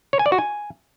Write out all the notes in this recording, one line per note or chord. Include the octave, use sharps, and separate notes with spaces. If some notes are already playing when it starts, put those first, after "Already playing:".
C#5
G#5
D5
F#4
G#5